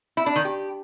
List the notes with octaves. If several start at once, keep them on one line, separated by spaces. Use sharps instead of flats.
E4
D4
D#3
G4